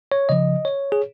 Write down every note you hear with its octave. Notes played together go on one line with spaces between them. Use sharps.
C#5
C#3 F3 D#5
C#5
G#4